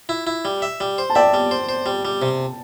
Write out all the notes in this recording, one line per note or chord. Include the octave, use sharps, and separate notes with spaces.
E4
E4
G3
E5
G3
C5
A5
D5 E5 G5
G3
C5
C5
G3
G3
C3